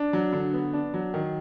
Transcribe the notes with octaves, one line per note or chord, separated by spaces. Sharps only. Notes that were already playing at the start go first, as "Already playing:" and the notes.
Already playing: D4
F#3
D3
B3
D4
F#3
D#3